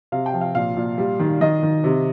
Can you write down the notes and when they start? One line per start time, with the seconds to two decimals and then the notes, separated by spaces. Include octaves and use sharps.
0.12 C3 F5
0.26 G5
0.34 F3
0.41 F5
0.55 A#2 F5
0.77 A#2
0.98 G3
1.19 D#3
1.41 D#3 D#5
1.63 D#3
1.84 C3